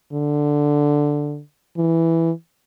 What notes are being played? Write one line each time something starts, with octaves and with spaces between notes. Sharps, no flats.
D3
E3